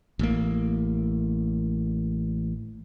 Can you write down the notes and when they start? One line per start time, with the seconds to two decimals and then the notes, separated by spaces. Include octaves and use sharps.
0.19 A1 A#3